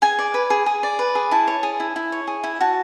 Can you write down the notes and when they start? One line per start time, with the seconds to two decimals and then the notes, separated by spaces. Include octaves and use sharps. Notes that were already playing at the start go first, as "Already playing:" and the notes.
0.02 G#4 G#5
0.19 D5
0.34 B4
0.50 G#4
0.66 G#4
0.83 D5
0.99 B4
1.15 G#4
1.31 E4 A5
1.47 C#5
1.63 G#4
1.80 E4
1.96 E4
2.12 C#5
2.27 G#4
2.44 E4
2.61 F#4 A5